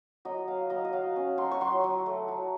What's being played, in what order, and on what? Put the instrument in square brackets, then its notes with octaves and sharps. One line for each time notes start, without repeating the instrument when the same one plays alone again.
[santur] F#3 D#5
F#3 F5
F#3 D#5
D#5
F#3 F5
C#4
F#3 C6
C#6
F#3 C6
F#3
A3
F#3